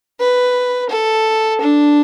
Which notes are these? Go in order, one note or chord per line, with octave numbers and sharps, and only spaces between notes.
B4
A4
D4